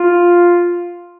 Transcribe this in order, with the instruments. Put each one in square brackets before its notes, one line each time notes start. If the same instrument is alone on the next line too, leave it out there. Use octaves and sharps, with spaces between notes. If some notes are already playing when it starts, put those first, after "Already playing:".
Already playing: [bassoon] F4